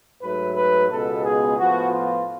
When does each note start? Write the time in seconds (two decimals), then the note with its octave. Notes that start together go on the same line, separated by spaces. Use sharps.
0.22 G#2 F#3 A3 B4
0.56 B4
0.90 C#2 B2 G#3 B3 A4
1.25 G#4
1.58 A2 F3 B3 F#4
1.93 F4